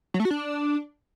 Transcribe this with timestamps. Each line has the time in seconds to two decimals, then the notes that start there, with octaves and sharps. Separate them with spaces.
0.14 F#3
0.20 A3
0.25 F#4
0.31 D4